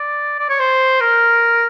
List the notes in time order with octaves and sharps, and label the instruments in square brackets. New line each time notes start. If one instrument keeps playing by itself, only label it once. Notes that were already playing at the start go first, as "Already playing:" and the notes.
Already playing: [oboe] D5
D5
C#5
C5
A#4